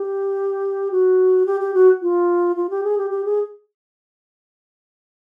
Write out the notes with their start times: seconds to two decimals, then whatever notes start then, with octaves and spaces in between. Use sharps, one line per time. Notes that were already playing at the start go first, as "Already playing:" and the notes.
Already playing: G4
0.91 F#4
1.46 G4
1.60 G4
1.74 F#4
2.02 F4
2.56 F4
2.70 G4
2.84 G#4
2.98 G4
3.11 G4
3.25 G#4